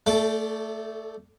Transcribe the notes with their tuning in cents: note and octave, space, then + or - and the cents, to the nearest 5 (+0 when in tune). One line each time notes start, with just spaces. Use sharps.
A3 +15 A4 -25 D5 +0